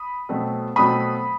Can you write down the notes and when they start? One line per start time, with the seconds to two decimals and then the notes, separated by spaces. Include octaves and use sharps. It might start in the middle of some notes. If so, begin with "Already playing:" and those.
Already playing: B5 D#6
0.29 B2 F#3 A3 C4
0.76 B2 F#3 A3 C4 B5 D#6